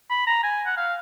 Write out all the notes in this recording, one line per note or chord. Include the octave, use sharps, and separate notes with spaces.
B5
A#5
G#5
F#5
F5